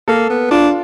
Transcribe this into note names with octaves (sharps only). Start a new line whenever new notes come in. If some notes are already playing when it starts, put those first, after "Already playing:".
A#3 A4
B3
D4 F4